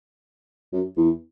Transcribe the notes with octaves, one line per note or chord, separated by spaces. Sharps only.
F#2
E2